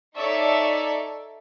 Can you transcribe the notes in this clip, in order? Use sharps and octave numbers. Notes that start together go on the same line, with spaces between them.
D#4 A4 C#5 D5 E5